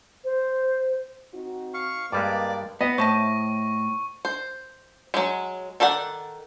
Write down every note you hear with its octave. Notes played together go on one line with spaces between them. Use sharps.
C5
C4 D#4 F#4
F5 C#6
G2 G3 G#3 A#3 B4 D5 D#5 D6
B3 D#5
A2 C5 A5 C#6 A#6
C5
F#3 G#3
D#3 A4 D5 F#5